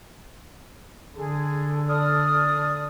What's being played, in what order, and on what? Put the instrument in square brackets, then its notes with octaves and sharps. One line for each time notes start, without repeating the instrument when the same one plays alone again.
[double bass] D3 [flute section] G#4
[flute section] D5 D#6 F6